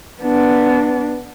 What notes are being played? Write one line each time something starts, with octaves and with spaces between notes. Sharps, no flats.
B3 D4